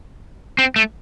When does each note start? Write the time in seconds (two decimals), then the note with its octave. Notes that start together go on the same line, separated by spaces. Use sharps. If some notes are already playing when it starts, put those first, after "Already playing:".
0.59 C4
0.76 A3